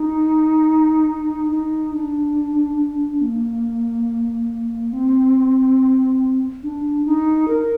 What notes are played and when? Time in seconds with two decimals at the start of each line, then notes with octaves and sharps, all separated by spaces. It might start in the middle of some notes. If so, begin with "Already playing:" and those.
Already playing: D#4
1.52 D#4
1.94 D4
3.21 A#3
4.93 C4
6.63 D4
7.05 D#4
7.48 A#4